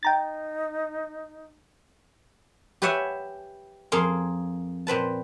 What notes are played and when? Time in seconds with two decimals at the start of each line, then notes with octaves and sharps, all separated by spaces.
0.03 D#4 G5 A#5 A6
2.82 G4 B4 C#5 E5 F#5 G#5
3.92 F2 A#3 G#4 F5 C6
4.87 A#2 C4 B4 A5